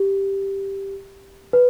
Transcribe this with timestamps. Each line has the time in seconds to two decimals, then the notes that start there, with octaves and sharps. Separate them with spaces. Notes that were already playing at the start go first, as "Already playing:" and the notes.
Already playing: G4
1.53 B4